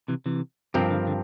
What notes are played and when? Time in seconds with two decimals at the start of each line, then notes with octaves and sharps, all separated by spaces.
0.08 C3 E3
0.26 C3 E3
0.74 G2 C3 F3 C4 G4 A#4
0.91 D3
1.07 D3